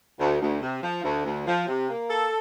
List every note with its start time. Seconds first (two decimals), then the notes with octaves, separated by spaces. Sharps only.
0.19 D2
0.41 D2
0.62 C3
0.83 F3
1.04 D2
1.25 D2
1.47 F3
1.67 C3
1.89 A#3
2.09 A4